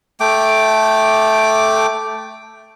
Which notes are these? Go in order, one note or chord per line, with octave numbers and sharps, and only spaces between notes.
A3 G5 D6